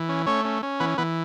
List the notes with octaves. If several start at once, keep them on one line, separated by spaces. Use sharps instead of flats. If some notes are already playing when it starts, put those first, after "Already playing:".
Already playing: E3
C#4
A3 C#4 C#5
C#4
C#4
E3 B3 B4
E3 B3 B4